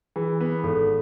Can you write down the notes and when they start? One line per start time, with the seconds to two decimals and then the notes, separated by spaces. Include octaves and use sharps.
0.16 E3 G#4
0.41 B3
0.63 G#1 A4